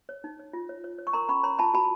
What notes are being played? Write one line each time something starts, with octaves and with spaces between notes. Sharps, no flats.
C#5
D#4
C#5
F4
C#5
C#5
C#5
C#6
A#4 A#5 C6
C#4 B5 C#6
C#5 A#5 C6
F4 A5 B5
F#4 A5 B5